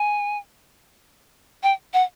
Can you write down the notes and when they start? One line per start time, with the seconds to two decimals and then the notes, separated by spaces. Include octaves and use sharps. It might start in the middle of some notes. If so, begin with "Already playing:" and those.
Already playing: G#5
1.63 G5
1.93 F#5